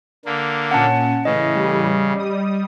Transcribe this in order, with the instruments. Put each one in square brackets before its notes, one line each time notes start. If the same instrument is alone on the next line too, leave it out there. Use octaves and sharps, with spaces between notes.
[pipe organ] D3 A#3
[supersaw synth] A#2 C#4 [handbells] F#5 A5
[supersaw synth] A2 E3 [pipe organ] C#3 [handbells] D#5
[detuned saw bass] G3
[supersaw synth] D#6